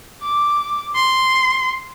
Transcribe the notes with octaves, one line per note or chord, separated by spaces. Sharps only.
D6
C6